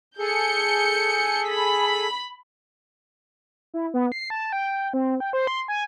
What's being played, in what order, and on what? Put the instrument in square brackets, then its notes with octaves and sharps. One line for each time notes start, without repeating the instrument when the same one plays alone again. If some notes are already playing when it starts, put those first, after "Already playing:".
[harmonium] G#4 A4 [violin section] G6 C#7
[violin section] B5 B6
[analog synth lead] E4
B3
C7
A5
G5
C4
G5
C5
C6
G#5